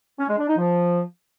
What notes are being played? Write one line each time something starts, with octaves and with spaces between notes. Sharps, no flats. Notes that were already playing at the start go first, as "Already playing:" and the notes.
C#4
G#3
D4
D#4
F3